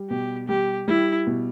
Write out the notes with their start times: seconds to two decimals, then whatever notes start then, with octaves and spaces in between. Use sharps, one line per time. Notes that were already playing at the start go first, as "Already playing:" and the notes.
Already playing: G3
0.10 B2 G4
0.49 G3 G4
0.88 G3 E4
1.27 B2